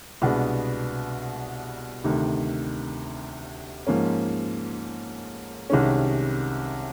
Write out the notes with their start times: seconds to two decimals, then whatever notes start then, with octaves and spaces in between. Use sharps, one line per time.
0.22 C2 B2 G#3 B3 D4
2.04 D2 C3 D#3
3.87 G#2 F3 A#3 C#4
5.70 C2 C3 D#3 G#3 C#4